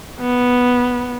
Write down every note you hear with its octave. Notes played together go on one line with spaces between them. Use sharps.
B3